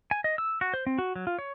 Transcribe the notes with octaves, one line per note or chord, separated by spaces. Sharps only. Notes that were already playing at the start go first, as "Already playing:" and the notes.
G#5
D#5
E6
F#4
C5
C4
F#4
F#3
F4
C#5